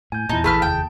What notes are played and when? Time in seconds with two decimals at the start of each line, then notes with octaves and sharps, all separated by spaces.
0.12 A2 G#5 G6
0.29 E2 A#2 D#4 E4 A5
0.44 A#1 E3 A3 G#4 B4 A5 F6
0.62 F1 D#2 G5